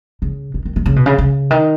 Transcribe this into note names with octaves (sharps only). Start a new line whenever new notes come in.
C#3
D#3
D#3
D#3
C#3
B2
C#3
C#3
D#3